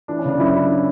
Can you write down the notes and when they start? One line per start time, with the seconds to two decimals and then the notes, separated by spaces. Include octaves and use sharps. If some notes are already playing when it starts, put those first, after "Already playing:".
0.08 E3 D4
0.19 C#4
0.25 C#3 D4
0.40 F#2 E4
0.55 F#2 E4